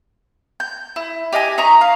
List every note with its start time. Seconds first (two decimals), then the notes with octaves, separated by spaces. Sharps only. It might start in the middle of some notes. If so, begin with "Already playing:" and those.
0.60 G6
0.96 E4
1.32 G4 D#5 F5 G#5
1.58 D#4 E5 A#5 C#6
1.81 F5